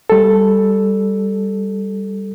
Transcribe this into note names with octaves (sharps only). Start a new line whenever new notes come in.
G3 A4